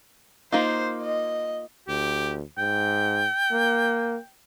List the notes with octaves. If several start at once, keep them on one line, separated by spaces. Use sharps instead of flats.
A#3 D#4 F4 C5
D#5
D2 G4
G#2 G5
A#3